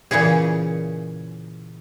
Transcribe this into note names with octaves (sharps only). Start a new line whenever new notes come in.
A#2 C#3 E3 C#4 G#4